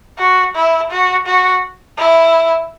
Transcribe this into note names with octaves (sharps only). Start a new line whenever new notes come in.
F#4
E4
F#4
F#4
E4